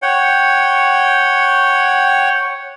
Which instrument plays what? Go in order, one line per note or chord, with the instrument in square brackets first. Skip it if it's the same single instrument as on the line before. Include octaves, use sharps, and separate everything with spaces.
[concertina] C#5 F#5 G5